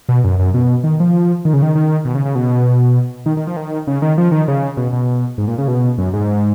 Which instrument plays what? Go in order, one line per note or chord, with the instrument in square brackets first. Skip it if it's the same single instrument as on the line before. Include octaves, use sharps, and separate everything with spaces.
[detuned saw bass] B2
F#2
F#2
B2
D#3
F3
D#3
C#3
D#3
D#3
B2
C#3
C#3
B2
D#3
D#3
F3
D#3
C#3
D#3
F3
D#3
C#3
B2
B2
G#2
A#2
C#3
B2
F#2
G#2